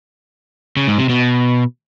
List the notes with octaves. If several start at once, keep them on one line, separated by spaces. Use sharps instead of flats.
C#3
G#2
C3
B2